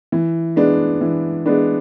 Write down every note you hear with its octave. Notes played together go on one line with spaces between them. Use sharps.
E3
G#3 B3 D4
E3
G#3 B3 D4